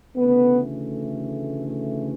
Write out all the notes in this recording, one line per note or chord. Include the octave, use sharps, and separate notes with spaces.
D2 C#3 E3 A3 B3